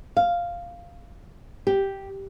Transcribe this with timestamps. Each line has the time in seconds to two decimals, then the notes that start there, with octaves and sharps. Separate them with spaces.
0.17 F5
1.67 G4